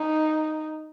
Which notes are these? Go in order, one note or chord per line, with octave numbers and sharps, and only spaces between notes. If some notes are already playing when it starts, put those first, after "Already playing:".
Already playing: D#4